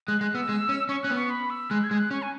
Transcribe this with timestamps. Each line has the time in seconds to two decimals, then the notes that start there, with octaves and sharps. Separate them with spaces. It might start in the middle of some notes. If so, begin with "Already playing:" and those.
0.08 G#3 F#6
0.21 G#3 F#6
0.35 B3 E6
0.49 G#3
0.69 C#4
0.89 C#4 C#6
1.03 C#4 F#6
1.10 B3
1.16 C#6
1.30 B5
1.50 E6
1.71 G#3 F#6
1.84 G#6
1.91 G#3
1.97 F#6
2.11 C#4 C#6
2.22 G#5